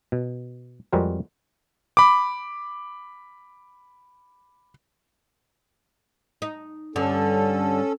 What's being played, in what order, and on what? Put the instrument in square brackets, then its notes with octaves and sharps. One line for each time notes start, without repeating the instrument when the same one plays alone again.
[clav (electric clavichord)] B2
F2 G3 G#3 C4 F#4 A#4
[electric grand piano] B5 D6
[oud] D#4
[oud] G2 D3 [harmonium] C#4 A4